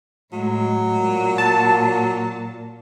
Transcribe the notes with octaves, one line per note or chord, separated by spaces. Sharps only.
A2 F#3 G#3
A#2
A5